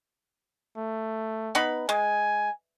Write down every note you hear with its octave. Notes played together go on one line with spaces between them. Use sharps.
A3
B3 D#4 B5
G#3 G#5